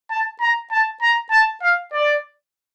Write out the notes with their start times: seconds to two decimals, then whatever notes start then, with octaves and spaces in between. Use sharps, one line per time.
0.10 A5
0.41 A#5
0.71 A5
1.02 A#5
1.31 A5
1.62 F5
1.93 D5